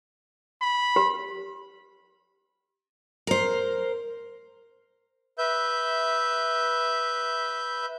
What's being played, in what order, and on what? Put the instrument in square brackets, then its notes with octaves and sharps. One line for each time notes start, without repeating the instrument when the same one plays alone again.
[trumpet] B5
[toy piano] G4
[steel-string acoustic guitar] A#4 C5
[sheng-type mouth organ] B4 E5 G6